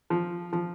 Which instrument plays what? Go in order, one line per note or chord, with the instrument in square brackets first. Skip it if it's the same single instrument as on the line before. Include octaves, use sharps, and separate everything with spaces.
[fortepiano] F3
F3